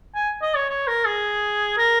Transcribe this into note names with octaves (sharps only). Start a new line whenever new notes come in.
G#5
D#5
C#5
C#5
A#4
G#4
A#4